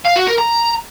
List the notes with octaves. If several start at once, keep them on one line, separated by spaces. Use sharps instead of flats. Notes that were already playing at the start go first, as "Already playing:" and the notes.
F5
F#4
A#4
A#5